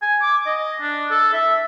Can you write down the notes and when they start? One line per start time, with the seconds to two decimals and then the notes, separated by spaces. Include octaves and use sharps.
0.02 G#5
0.22 D6
0.46 D#5
0.81 D4
1.11 A4
1.33 E5